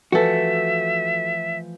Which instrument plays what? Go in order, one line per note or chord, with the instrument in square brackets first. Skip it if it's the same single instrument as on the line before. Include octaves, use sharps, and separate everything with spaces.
[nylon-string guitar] E3 F3 A3 [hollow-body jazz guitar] F#4 A4 [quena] E5